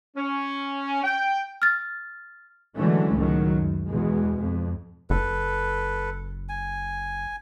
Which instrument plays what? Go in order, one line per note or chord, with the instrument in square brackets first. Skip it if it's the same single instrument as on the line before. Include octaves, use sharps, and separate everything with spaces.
[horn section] C#4
G5
[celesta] F6 A6
[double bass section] D3 E3 F#3 G#3 A3 C#4
C#2 A2 D#3 F#3
F#2
E2 B2 G#3
F2
[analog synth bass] F#1 [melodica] A4 B4
[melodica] G#5